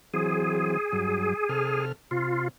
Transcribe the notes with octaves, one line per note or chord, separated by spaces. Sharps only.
E3 F#3 C4 G#4
G2 F#3
C3 A4 F6
C3 F4